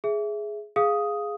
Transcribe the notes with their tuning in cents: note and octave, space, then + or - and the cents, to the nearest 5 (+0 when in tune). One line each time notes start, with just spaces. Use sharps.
G#4 +10 E5 +5
G#4 +0 F5 +0 D#6 +5